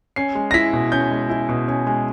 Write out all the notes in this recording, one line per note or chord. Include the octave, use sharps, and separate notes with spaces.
C#4 C7
G#3
A#6
E4 B6
B2
C#4 G6
G#3
E4
B2
C#4
G#3